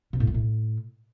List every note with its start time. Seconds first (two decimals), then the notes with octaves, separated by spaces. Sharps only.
0.13 C3
0.20 A2
0.27 A3
0.34 A2